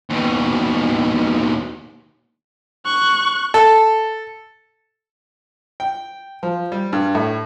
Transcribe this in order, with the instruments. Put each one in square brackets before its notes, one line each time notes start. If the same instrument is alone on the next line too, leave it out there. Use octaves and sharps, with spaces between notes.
[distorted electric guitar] D#2 B2
[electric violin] C#6 F#6
[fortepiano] A4
G5
F3
G3
G2
A2